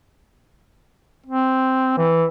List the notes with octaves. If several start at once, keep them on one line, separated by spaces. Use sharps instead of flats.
C4
E3